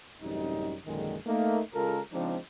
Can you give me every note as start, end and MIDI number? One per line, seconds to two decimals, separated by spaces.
0.22 0.77 33
0.22 0.77 42
0.22 0.77 48
0.22 0.77 55
0.22 0.77 63
0.86 1.15 34
0.86 1.15 42
0.86 1.15 50
0.86 1.15 51
0.86 1.15 56
1.26 1.61 57
1.26 1.61 58
1.26 1.61 63
1.74 2.00 49
1.74 2.00 56
1.74 2.00 65
1.74 2.00 69
1.74 2.00 70
2.13 2.37 49
2.13 2.37 53
2.13 2.37 56
2.13 2.37 60
2.13 2.37 62
2.13 2.37 63